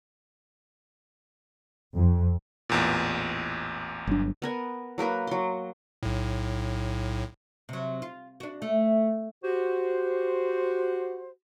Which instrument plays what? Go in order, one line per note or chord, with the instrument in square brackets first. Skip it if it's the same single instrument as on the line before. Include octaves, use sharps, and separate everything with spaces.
[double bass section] F2
[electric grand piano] A1 E2 A#2
[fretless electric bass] G1 F#3 D4
[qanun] B3 A#4 G#5
F#3 A#3 A#4 B4
F#3 C6
[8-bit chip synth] B1 A2
[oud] C3 F#3
F4
D4 F#4
A3
[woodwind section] F#4 G4 C5